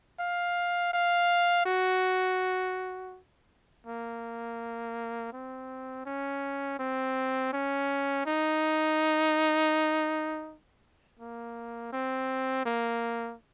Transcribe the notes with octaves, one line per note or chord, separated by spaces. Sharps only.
F5
F5
F#4
A#3
C4
C#4
C4
C#4
D#4
A#3
C4
A#3